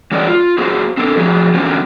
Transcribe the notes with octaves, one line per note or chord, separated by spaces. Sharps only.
E3 F#3 G#3 C#4 A#4 D5
F4
A#3 F#4 G#4 C5
C4 D4 A4 A#4
F3 F#3 G#4
D3 E3 F#3 A#3 C4 C#4